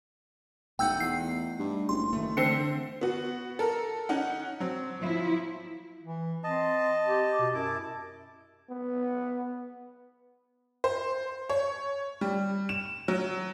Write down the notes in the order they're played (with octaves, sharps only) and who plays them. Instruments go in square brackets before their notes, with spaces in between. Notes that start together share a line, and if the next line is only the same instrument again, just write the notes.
[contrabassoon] E1 [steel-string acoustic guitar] A3 D#4 F#5 [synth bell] G5 E6 G6
[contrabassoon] E2 [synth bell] C7
[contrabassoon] G2
[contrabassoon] F#1 [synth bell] C6
[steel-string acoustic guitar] D#3 A3
[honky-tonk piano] D3 C4 [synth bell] C7 C#7
[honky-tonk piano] B3 F#4
A4 A#4
C#4 D#4 F#5
F#3 C4
[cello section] F3 E4
[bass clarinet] E3
[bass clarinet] C4 [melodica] D#5 A5
[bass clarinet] G4
B2
[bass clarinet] F#2 [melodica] E4 A5 D6
[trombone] B3
[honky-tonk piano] C5
C#5
G3
E7
F#3